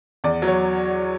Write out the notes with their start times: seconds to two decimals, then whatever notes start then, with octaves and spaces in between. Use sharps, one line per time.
0.24 E2 D5
0.42 F#3
0.47 C#5